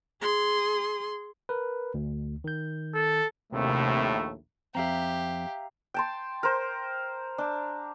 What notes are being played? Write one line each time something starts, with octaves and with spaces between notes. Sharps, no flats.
G#4 C6
A#4 B4
D2
D#3 G6
A4
A#1 D#2 A2 C3 A3
F2 C4 G4 E5 F5 A#5
G5 A5 C6
A#4 C5
D4